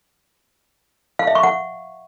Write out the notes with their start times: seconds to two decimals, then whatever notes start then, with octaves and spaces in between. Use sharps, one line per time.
1.19 F5
1.27 E5
1.35 C#6
1.43 F#5